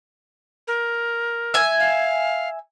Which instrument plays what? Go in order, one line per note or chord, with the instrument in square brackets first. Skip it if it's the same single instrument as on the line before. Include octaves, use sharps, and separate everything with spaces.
[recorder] A#4
[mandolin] E5 G#5
[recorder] F5